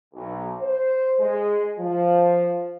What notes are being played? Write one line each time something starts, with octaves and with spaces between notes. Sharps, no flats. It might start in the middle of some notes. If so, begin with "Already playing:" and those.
B1
C5
G#3
F3